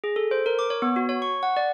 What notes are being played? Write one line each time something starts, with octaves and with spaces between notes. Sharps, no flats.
G#4
A4
C5
A#4
D6
C#5
B3
F#4
C#5
C#6
F#5
D5